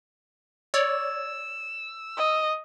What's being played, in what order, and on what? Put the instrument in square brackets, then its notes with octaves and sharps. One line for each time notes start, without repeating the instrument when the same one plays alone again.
[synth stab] C#5 D5 [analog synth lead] E6
[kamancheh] D#5